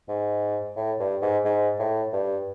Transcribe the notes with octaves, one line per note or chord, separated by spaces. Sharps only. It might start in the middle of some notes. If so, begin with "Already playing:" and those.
G#2
A2
G2
G#2
G#2
A2
G2